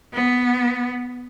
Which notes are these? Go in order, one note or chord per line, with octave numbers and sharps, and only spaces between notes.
B3